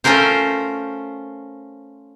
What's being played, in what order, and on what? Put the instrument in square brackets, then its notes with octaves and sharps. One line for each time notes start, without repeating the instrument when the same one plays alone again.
[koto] A3 C#4 F4 A#4 C5